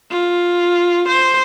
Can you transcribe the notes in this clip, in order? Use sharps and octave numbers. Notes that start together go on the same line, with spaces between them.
F4
C5